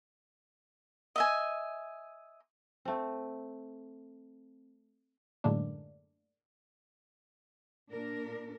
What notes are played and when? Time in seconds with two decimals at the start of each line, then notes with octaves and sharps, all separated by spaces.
1.16 D#5 E5 G#5
2.85 A3 C4
5.44 F#2 A2 D3 G#3 A#3 D4
7.90 A#2 D4 A#4